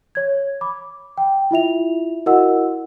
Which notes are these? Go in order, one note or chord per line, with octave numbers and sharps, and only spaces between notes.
C#5 G#6
B5 D6
G5
E4 F4 E5 F7
E4 F#4 A#4 D#5 F#5 E6